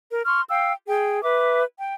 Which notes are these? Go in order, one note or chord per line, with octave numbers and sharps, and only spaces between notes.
A#4
C6 C#6 F6
F5 G5 E6
G#4 G5
B4 E5 D6
G5